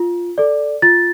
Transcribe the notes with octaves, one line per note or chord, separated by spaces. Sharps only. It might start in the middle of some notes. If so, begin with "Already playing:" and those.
Already playing: F4
A4 D5
F4 A6